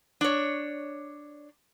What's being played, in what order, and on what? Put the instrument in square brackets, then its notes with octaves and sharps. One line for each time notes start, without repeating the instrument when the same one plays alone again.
[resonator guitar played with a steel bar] D4 C#5